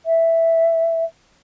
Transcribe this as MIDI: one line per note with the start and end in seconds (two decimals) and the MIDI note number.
0.06 1.05 76